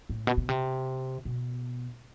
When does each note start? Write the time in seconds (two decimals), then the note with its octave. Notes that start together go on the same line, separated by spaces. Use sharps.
0.09 A2
0.27 B2
0.37 B2
0.49 C3
1.25 B2